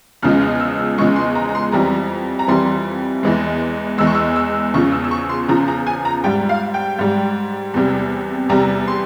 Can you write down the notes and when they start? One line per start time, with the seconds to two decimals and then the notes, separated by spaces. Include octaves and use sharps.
0.22 E2 C#3 F3 G#3 F6
0.42 F6
0.60 E6
0.98 E2 C#3 F3 G#3 C#6
1.16 C6
1.35 A#5
1.49 A#5
1.55 C6
1.72 F2 E3 G3 A#5
2.39 A#5
2.47 F2 E3 G3 C6
3.23 E2 E3 G#3
3.98 E2 E3 G#3 E6
4.07 C#6
4.15 E6
4.36 E6
4.74 E2 C#3 F3 C#6
4.92 E6
5.04 E6
5.11 C#6
5.29 C6
5.48 E2 C#3 F3 A#5
5.68 A#5
5.87 G#5
6.05 A#5
6.24 G#2 G3 G5
6.49 F5
6.74 G5
6.99 G#2 G3
7.74 E2 C3 G3
8.49 E2 C3 G3 A#5
8.88 C6